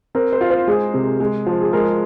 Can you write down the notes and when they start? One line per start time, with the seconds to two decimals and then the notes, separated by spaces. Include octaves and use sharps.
0.15 C4 A#4
0.32 C5
0.41 F4
0.50 C5
0.67 G#3 G#4
0.94 C3
1.20 G#3
1.46 F3
1.61 G#4
1.73 G#3 A#4